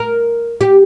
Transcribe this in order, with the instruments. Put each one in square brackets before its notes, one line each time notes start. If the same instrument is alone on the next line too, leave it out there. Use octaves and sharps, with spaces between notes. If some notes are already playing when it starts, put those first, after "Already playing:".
Already playing: [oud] A#4
G4